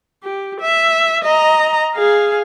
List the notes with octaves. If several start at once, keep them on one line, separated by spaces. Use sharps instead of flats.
G4
E5
D#5 A#5
G#4 F5